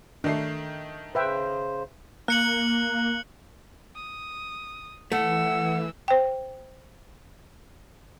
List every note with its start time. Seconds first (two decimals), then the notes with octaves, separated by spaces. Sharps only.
0.24 D#3 A3 D4 C7
1.15 C#3 B4 C5 E5 G5
2.28 A#3 F#6 C#7 F#7
3.95 D#6
5.12 E3 A3 F#5 E6
6.08 C5 G5